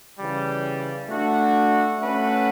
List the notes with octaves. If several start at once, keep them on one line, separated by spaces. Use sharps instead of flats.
C#3 E3 G3
A3 D4 F#4
A3 C#4 F#4 B4